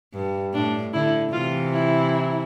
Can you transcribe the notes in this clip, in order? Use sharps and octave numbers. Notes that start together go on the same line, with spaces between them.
G2
A2 D4
D3 E4
C3 E3 F4
E4